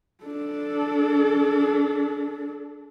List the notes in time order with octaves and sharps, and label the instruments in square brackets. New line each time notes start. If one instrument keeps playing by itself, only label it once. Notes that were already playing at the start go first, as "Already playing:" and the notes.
[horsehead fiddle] D4 A4